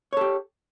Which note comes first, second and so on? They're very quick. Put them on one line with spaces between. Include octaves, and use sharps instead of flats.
C#5 A4 G4